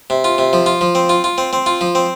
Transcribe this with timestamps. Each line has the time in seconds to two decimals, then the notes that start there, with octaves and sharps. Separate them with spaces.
0.10 C3
0.24 F4
0.38 C3
0.53 F3
0.66 F4
0.81 F3
0.95 C4
1.09 F4
1.24 F4
1.38 C4
1.53 C4
1.66 F4
1.81 F3
1.95 C4